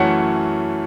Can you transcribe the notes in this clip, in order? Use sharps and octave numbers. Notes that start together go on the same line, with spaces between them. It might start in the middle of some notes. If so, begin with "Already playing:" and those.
Already playing: F#2 E3 A3 C#4 F#5